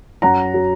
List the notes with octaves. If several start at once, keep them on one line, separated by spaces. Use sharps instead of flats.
F#2 F#5 A#5
F#3